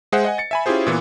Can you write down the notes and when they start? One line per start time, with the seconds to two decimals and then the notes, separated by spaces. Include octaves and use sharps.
0.12 G#3 G#4 C5 E5 F#5
0.25 D#5 F#5 G#5
0.38 A6 C#7
0.51 E5 G#5 B5
0.66 C#4 E4 F4 G4 G#4 C5
0.87 A#2 E3 B3